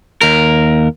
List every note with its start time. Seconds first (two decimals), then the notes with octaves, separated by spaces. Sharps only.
0.21 D#2 A#4